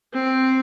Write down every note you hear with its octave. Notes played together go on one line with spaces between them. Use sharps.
C4